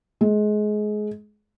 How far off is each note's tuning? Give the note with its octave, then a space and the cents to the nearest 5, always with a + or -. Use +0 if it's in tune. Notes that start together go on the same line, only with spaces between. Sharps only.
G#3 +25